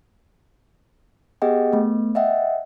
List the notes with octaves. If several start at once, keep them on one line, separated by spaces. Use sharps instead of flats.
B3 G4 G#4 D#5 F#5 G5
A3 B3
D#5 E5 F#5 G5